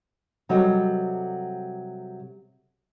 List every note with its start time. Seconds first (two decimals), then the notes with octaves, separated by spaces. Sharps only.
0.49 C3 F#3 G3 A4 D#5